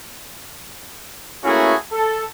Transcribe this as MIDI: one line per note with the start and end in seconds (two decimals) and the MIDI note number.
1.45 1.74 57
1.45 1.74 58
1.45 1.74 61
1.45 1.74 64
1.45 1.74 66
1.45 1.74 68
1.92 2.22 69